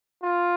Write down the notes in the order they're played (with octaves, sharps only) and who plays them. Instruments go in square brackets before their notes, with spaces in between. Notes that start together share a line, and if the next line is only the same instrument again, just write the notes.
[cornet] F4